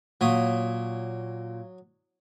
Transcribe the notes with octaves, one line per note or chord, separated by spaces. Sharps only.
A#2 F#3 C#5 D#6